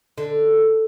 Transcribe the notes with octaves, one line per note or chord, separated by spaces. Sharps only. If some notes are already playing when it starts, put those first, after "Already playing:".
D3